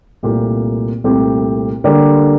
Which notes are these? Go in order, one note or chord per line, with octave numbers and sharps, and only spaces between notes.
C2 A#2 A3 C4 G4
C2 A#2 A3 C4 G4
D3 G3 A#3 D4 G4